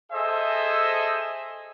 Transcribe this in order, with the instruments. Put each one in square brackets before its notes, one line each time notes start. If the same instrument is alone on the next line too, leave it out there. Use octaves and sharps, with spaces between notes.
[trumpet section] G#4 A4 C5 D#5 E5